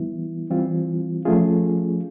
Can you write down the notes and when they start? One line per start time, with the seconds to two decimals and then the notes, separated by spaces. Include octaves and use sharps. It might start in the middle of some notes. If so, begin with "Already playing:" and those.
Already playing: E3 G3 B3 E4
0.50 E3 G3 C4 F4
1.25 F3 A3 C#4 F4 G#4